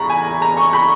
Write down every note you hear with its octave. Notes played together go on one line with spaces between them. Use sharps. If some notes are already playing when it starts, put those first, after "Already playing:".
Already playing: E2 G3 A#5 B5 C#6
G#5
A#5
C#6
B5